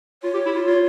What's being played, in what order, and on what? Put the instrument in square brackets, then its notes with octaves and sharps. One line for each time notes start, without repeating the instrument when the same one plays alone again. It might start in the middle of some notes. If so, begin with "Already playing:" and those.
[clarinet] F4 [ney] C#5
[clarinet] G4
E4
F4
F4